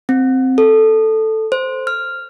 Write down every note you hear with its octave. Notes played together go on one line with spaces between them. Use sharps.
C4
A4
C5
F6